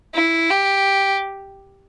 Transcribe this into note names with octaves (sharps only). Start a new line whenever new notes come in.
E4
G4